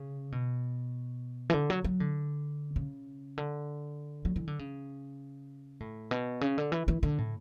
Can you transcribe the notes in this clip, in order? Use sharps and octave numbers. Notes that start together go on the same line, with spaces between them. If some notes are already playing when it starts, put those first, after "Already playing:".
Already playing: C#3
B2
E3
D3
F#3
F#3
D3
C#3
D3
F#3
E3
D3
C#3
A2
B2
C#3
D3
E3
E3
D3
A2